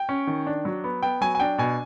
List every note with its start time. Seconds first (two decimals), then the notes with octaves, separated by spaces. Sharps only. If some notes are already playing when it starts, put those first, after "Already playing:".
Already playing: G5
0.09 C#4
0.27 D#3
0.47 D4
0.65 F#3
0.84 B3
1.02 B3 G5
1.21 F#3 G#5
1.35 G#5
1.40 D4 G5
1.58 B2 G#5